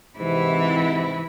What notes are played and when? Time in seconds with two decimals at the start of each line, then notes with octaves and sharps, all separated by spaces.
0.18 G#2 C3 E3 E4